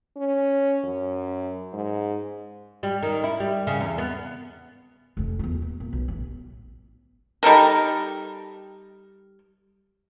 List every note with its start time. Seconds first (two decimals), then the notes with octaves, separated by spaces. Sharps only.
0.17 C#4
0.84 F#2
1.73 G#2
2.83 G3
3.03 D#3
3.24 E4
3.40 G3
3.67 C#3
3.81 E2
3.98 B3
5.17 F1 F2
5.39 E2 F4
5.62 D#1
5.80 A#2
5.93 B1
6.08 A1
7.43 G3 D#4 A4 A#4